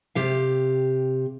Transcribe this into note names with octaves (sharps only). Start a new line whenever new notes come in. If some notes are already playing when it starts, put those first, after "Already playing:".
C3 G4 F5